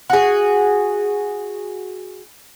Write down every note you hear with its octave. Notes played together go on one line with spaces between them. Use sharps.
F#4 G#4